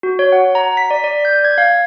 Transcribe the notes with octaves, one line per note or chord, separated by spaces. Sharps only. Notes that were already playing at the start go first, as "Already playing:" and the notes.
F#4
C#5
F#5
A#5
B6
D5
D5
G6
G#6
F5